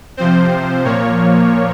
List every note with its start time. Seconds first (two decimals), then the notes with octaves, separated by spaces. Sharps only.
0.17 C3 F3 C4 C5
0.85 A#2 F3 A#3 C#5